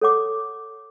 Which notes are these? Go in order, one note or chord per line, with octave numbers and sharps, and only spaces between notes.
A4 C#5 F#5 D6